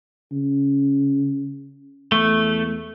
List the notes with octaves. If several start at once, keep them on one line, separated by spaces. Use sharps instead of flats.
C#3
E2 A3